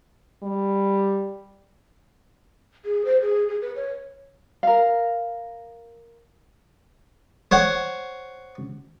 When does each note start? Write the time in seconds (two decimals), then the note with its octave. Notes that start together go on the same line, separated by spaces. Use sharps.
0.43 G3
2.85 G#4
3.05 C5
3.21 G#4
3.48 G#4
3.62 B4
3.76 C#5
4.63 A#4 F5
7.51 C5 C#5 F#5